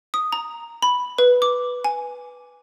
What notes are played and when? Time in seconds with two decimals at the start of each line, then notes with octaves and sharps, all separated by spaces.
0.14 D#6
0.32 A#5
0.82 B5
1.18 B4
1.42 D6
1.85 G#5